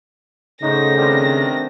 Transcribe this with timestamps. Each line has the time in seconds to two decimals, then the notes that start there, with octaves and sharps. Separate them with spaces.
0.62 A2 C#3 D#4 F#4 C5 A#6
0.97 C3 D#3 G3 C4 D4